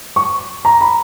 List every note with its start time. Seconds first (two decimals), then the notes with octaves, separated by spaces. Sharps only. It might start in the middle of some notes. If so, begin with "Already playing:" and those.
0.16 C#6
0.65 A#5
0.81 B5